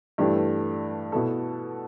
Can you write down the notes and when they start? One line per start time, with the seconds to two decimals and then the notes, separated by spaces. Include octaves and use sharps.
0.18 G2 E3 A3 D4 G4
1.12 B2 B3 E4 A4